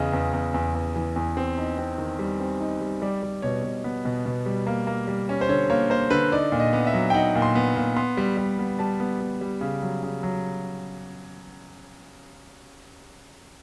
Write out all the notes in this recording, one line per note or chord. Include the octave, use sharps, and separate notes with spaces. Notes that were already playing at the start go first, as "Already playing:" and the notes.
Already playing: E2 C#3 D#5
E2
E2
E2
E2
E3
E2
C4
D#4
C4
D#3
G3
C4
D#4
G3
G3 D5
G3
B2 C#5
B2
B3
B2
B2
G3
A#3
A#3
G3
C#4
C5
D3 C#5
A#3 C#5
A#3 C5
D3 B4
D#4 D5
A#2
D#5
B3
E5
F#3
G5
D#4 F#5
A#2
C6
B3
A#2
B3 C6
G3
G3
B3
G3 A5
B3
B3
G3
C#3
F#3
C#3
F#3